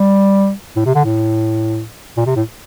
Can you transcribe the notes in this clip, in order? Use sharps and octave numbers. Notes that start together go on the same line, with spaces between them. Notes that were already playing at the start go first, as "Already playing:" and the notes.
Already playing: G3
A2
C3
D3
A2
A#2
C3
A2